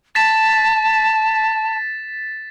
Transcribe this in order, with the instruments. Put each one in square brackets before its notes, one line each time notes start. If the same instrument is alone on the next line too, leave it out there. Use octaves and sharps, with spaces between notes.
[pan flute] A5 [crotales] A6 B6 E7